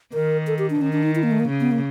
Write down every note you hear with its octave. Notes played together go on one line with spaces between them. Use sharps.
D#3 A#4
A4
G4
D4
D#3 C#4
D4
D#4
E4
A#3
A3
A#3
C#3
B3
A#3